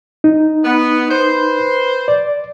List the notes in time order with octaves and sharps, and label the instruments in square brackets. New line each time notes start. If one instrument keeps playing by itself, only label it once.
[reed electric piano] D#4
[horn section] B3
B4 C5
[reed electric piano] D5